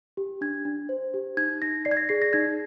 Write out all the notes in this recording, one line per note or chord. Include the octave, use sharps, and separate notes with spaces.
G4
D4 G#6
D4
C5
G4
D#4 G#6
D#4 A#6
D5 C7
G#6
A#6
G#4 C7
A#6
D#4 G#6